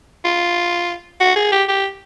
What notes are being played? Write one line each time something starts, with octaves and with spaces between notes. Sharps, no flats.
F4
F#4
G#4
G4
G4